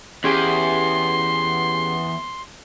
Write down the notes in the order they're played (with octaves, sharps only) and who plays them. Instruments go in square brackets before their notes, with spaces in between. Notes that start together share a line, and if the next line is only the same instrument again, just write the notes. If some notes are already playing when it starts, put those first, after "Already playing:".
[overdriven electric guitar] E2 [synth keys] C#4 G4 G#4 [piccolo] C6